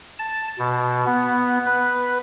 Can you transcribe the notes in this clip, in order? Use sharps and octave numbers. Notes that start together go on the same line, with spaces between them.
A5
B2
B3
B4